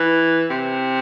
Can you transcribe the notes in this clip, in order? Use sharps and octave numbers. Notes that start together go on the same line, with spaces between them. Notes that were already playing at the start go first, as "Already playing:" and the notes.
Already playing: E3
C3